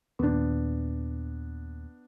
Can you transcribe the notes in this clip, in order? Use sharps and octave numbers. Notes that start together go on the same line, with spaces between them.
D#2 A#2 B3 D4